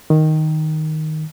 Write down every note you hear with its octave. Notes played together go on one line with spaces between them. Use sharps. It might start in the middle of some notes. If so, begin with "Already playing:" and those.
D#3